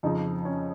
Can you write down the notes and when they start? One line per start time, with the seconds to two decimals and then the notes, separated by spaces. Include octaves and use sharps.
0.03 F2 C#3 F3 D#4
0.45 C#4